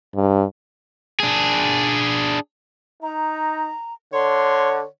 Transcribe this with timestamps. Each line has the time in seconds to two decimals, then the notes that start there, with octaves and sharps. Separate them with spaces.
0.16 G2
1.20 D4 G#4
3.03 D#4 A#5
4.13 D3 C#5 C6